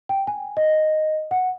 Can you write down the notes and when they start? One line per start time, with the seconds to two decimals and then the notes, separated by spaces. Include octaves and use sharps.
0.09 G5
0.27 G#5
0.57 D#5
1.31 F#5